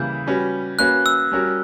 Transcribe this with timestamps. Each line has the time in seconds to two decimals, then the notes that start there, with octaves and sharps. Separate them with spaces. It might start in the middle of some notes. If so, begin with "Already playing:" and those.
Already playing: C#3 E3 G3 A#3 E4 G6
0.27 G3 C#4 F#4 B4
0.79 A#3 C#4 F#4 B4 F#6
1.06 E6
1.31 G3 C#4 F#4 A#4